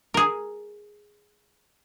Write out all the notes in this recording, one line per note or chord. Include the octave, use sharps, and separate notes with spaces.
G#4 A#4